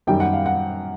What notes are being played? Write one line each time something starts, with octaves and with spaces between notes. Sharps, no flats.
F#2 D#3 G3 G5
F#5
F5
F#5